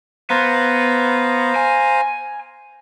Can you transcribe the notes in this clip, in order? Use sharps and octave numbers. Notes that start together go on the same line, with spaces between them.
B3 C5 F5 A#5
G#5